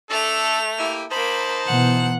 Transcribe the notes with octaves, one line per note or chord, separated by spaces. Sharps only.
A3 D4 A4 F7
A#3 E4 G4
A#3 D#4 C5 A5 B5
B2 E3 B3 F#5